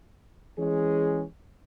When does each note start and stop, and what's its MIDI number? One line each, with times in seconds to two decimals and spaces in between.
0.58 1.23 52
0.58 1.23 56
0.58 1.23 61
0.58 1.23 68